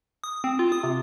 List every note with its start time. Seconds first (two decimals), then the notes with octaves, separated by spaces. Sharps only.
0.24 D#6
0.44 C4
0.59 F4
0.72 D#6
0.83 C3